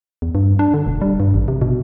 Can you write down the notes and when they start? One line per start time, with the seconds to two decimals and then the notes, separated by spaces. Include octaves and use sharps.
0.22 E2
0.35 G2
0.59 D4
0.74 D3
0.87 E1
1.01 G3
1.20 G2
1.34 A1
1.48 C3
1.62 B2